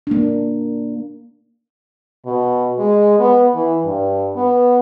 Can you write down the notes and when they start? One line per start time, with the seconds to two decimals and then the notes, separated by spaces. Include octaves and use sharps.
0.07 A#3 D4
2.26 B2
2.78 G#3
3.20 B3
3.55 E3
3.85 G2
4.36 B3